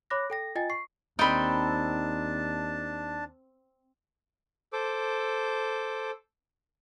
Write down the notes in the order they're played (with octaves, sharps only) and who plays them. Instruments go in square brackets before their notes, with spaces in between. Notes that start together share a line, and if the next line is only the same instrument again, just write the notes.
[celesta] C#5 B5 D6 F#6 A#6
A4 G5 A#6
F4 D#5 G5 G#5 A6
C#6 C7
[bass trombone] D#2 [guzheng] C4 G5 [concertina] D4 A5 [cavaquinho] D#4 B5
[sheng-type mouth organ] A4 C5 D6